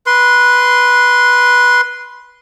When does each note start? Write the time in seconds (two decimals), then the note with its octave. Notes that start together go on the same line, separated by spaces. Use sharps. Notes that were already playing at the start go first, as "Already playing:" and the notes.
0.06 B4 C6